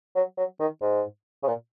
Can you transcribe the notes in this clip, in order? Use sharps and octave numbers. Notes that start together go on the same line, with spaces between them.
F#3
F#3
D#3
G#2
C#3
A#2